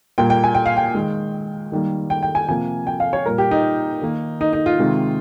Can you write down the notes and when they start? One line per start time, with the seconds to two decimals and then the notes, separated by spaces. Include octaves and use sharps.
0.18 A#2 G3 A#3 G5
0.30 G5
0.44 G#5
0.55 G5
0.66 F5
0.77 G5
0.95 D#3 G#3
1.72 D#3 G3 A#3
2.10 G5
2.23 G5
2.35 G#5
2.48 C3 F3 A#3 G#5
2.87 G5
3.00 F5
3.13 C#5
3.25 A#2 G3 A#3 A#4
3.38 G4
3.51 D#4
4.02 D#3 A#3
4.41 D#4
4.53 D#4
4.66 F4
4.79 C3 D#3 G#3